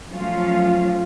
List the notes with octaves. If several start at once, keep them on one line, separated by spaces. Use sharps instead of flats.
F3 F#3 A3 C#4 F4 F5